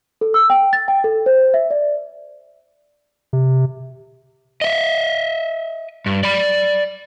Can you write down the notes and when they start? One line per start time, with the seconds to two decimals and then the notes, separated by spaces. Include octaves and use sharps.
0.21 A4
0.34 E6
0.50 G5
0.73 A6
0.88 G5
1.04 A4
1.26 C5
1.54 E5
1.71 D5
3.33 C3
4.61 D#5 E5
6.06 G2
6.23 D5 B5